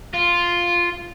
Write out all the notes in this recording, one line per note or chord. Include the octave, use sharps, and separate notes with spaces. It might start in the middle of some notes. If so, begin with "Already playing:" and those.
F4